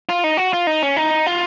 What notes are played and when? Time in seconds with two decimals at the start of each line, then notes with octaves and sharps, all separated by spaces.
0.09 F4
0.24 D#4
0.37 F#4
0.53 F4
0.67 D#4
0.82 C#4
0.97 D#4
1.26 F4